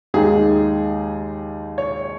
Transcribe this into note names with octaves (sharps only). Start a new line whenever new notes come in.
D#2 D#3 G#3 D#4 G#4
C#5